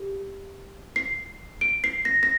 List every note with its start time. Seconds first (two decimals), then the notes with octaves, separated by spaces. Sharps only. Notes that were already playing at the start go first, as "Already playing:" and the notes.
Already playing: G4
0.96 C7
1.61 D7
1.84 C7
2.05 A#6
2.23 A#6